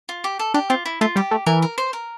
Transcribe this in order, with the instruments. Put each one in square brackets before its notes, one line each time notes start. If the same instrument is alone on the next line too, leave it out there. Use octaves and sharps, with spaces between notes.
[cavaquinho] F4
G4
A4
[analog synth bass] D4 [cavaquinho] G4
[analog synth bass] C4 [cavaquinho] F4
[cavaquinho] E4
[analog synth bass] A3 [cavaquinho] F4
[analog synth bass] G3 [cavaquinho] G4
[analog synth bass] A3
[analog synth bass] E3 [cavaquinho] A#4
[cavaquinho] A#4
C5
A#4